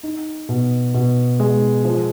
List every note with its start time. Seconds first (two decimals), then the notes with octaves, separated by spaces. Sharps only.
0.03 D#4
0.49 B2
0.94 B2
1.40 G#3
1.85 F3